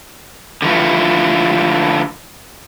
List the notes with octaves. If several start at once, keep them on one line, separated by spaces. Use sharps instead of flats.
D3 E3 F3 A3